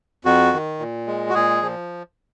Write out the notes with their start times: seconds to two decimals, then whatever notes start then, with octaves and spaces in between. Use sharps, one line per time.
0.25 F2 F#4
0.53 D#3
0.79 A#2
1.07 G#3
1.29 F#4
1.34 A#2 G#4
1.62 F3